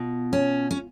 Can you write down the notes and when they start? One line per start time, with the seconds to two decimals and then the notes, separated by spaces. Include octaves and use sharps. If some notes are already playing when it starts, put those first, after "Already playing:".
Already playing: B2 F4
0.33 C#4
0.71 C#4